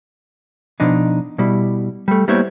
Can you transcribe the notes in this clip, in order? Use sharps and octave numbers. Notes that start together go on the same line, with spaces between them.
B2 F3 D4 D#4
B2 G3 E4
G3 A3
G3 A#3 B3 E4 C5 C#5